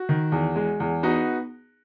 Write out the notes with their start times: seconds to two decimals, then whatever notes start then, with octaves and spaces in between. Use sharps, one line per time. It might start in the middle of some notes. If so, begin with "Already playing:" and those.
Already playing: F#4
0.09 D#3
0.32 E2
0.56 G#3
0.80 E2
1.03 B3 D#4 F#4